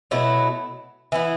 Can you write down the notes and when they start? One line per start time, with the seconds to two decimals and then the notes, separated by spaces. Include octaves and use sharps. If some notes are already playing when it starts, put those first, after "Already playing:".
0.11 B2 F#3 A3 E4
1.12 E3 B3 E4